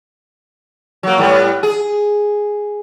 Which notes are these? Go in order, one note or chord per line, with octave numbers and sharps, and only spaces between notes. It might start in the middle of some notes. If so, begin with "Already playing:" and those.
F#3 A#3
A2 G3 B3
G#4